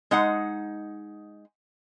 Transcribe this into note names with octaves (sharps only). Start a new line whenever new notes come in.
G#3 D#4 F#5